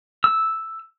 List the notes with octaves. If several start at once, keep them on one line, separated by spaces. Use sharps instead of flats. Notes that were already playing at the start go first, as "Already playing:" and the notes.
E6